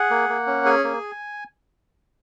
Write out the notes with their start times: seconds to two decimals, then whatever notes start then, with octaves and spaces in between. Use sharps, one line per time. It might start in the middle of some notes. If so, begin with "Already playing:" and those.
Already playing: G#4 F#5
0.10 A#3
0.29 A#3
0.47 C#4
0.65 G#4 G#5
0.84 A#3